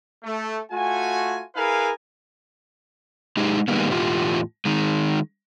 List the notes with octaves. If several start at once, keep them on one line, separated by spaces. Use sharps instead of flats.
A3
A3 F4 F#4 G#5
E4 G#4 A#4 B4 F5 G#5
G#3 D#4 G4 G#4
D#3 G3 G#3 A#3 B3
E2 A2 A3 F4 G4
D#3 G#3